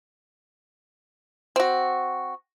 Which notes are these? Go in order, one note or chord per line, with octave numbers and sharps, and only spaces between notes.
C4 F#4